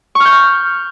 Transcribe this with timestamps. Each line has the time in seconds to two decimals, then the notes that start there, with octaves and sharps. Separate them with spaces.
0.15 C#6
0.20 F6
0.25 G6